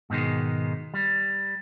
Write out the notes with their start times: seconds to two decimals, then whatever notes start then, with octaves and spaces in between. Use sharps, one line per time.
0.10 G#2 B2 D#3 G#3
0.94 G3